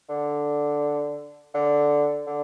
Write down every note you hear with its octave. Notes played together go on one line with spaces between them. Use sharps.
D3
D3
D3